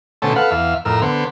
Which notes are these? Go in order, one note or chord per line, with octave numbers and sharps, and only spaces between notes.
B2 D3 A3 C#4 C5 A5
A4 B4 F5 F#5
E2 E5 F5
F2 A2 A#4 E6
D3 B3 C5